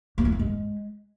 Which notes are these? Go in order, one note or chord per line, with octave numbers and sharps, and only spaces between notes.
A#3
E4
B3
G#3